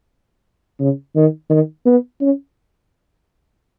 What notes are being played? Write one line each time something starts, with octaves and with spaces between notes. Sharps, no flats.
C#3
D#3
D#3
B3
C#4